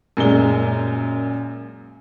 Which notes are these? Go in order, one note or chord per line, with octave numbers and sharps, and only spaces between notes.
F#2 A#2 G#3 G7